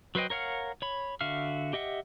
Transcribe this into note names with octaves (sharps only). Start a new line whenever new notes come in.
F#3 B4 C5 D#5 G5
A#4 C#5 F5 F#5 F6
C#5 B5
D3 F#4 E5 F5 F6
G4 D#5 E5 F#5